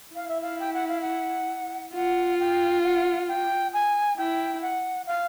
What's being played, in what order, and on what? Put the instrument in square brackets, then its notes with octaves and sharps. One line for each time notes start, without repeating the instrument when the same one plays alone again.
[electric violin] E4 [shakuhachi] F5
[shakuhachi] E5
F5
G5
F#5
F5
F#5
[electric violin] F4 [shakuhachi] F#5
[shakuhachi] G5
F#5
G5
G#5
[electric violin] E4 [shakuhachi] G5
[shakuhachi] F#5
F5